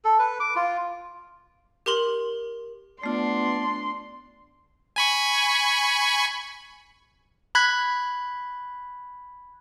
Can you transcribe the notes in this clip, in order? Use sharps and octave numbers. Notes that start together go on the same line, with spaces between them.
A4
B4
D6
F4
G4 A#4 C6 F#7
A3 B3 D4 F4 C6
G#5 B5 C#6
B5 F#6 G#6 B6